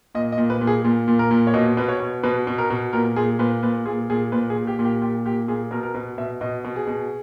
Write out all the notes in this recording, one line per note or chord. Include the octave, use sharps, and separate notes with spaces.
A#2 D#5
D#5
A#2
B4
A#2
G#4
A#2
A#2
A#4
A#2
C#5
B2 D#5
B2 B4
C#5
B2
B2 B4
B2
A#4
B2
A#2 A#4
A#2 G#4
A#2 B4
A#2 B4
A#2 G#4
A#2 G#4
A#2 B4
G#4
A#2
G4
A#2
G4
A#2 G4
A#2 G4
A#2 G#4
B2 A#4
A#4
B2 B4
B2 E5
B2 D#5
B2
G#4
B2